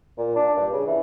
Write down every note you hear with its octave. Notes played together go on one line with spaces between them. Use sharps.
A#2
D4
G2
C#3
E3